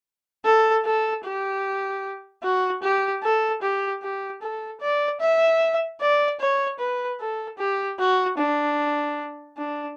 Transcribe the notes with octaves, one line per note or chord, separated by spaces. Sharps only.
A4
A4
G4
F#4
G4
A4
G4
G4
A4
D5
E5
D5
C#5
B4
A4
G4
F#4
D4
D4